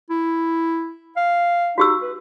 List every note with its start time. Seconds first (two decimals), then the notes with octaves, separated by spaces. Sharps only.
0.10 E4
1.17 F5
1.78 D#4 F#4 G4 E6
2.02 B4